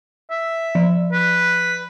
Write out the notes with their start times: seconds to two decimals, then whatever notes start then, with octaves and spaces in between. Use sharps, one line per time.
0.30 E5
0.75 F3
1.12 B4